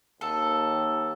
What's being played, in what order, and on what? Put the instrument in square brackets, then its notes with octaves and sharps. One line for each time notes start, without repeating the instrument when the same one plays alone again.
[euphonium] D#2 [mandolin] A4